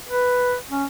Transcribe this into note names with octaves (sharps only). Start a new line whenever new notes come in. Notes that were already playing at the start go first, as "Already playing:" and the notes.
B4
C#4